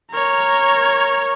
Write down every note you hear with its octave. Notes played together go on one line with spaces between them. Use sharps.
A#4 C#5